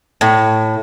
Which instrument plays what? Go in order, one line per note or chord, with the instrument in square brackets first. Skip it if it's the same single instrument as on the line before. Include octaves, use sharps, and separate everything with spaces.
[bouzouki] A2